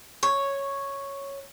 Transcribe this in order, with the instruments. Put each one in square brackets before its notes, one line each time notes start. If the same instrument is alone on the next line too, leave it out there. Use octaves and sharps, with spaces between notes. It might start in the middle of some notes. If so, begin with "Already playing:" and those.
[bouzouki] C#5